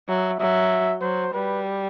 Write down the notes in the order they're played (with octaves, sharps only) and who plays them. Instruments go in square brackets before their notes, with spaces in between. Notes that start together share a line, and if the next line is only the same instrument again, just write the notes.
[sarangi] F#3 [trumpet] E5
[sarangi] F#3 [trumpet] E5
[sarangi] F#3 [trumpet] C5
[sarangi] G3 [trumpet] B4